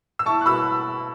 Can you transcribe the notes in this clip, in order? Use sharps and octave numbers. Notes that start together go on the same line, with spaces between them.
E6
E4 A5 C#6
F#6
B2 B5 E6